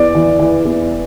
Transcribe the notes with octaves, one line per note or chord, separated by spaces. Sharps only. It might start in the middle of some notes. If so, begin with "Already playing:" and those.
Already playing: E2 D5
E3
E3
E2